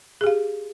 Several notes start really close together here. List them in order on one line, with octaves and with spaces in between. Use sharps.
G#4 G4 F5